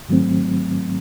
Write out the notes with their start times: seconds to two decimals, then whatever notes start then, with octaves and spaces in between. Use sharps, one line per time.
0.09 G#2 D#3 F#3 A3 C4